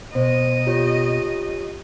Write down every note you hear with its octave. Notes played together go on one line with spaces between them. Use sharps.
B2 C5 D#5
F4 G4 C#5